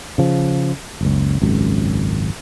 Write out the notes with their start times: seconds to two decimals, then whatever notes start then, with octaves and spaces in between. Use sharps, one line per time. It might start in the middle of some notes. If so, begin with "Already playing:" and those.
0.18 C#3 F3
1.01 F#1 C#2
1.42 G#1 C#2 F#2